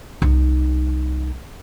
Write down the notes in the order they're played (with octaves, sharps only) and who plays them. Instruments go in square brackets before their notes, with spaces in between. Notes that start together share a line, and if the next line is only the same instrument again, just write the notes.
[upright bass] C2 D#4